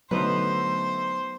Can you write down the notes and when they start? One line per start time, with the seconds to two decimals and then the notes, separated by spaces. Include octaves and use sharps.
0.11 D3 F#3 A3 B3 D#4 B4 C5